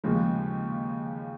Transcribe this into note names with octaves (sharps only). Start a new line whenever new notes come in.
D#2 C#3 F3 G#3